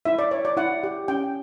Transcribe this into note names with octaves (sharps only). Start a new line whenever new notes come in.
E4 E5
D5
C#5
D5
E4 F#5
G4
C#4 G5